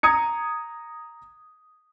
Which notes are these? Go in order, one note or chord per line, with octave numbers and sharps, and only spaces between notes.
A#5 D#6 G#6 C#7